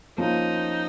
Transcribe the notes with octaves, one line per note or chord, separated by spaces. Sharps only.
F3 A#3 C#4 D#4 F4